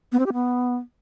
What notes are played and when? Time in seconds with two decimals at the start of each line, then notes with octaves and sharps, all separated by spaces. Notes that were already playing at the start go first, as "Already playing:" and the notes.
0.12 B3
0.19 C4
0.26 G4
0.33 B3